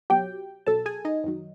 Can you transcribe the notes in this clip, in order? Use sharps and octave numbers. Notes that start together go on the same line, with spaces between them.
B1 B2 F#3 G4 G5
B1 B2 F#3 A4 A5
G#4 G#5
D#4 D#5
F#2 D#3 F#3